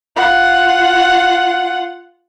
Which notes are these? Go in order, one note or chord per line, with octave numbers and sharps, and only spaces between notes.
F4 F#5